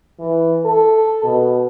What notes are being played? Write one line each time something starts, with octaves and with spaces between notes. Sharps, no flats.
E3
A4
B2